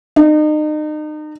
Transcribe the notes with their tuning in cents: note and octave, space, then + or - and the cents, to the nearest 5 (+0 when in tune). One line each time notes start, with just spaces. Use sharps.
D#4 -35